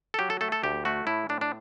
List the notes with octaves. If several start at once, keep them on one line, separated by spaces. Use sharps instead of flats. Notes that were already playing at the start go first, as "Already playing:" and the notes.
A4
F#3 G4
A4
A3 A4
A4
D2 G4
A3 F#4
A2 E4
A2 D4
D4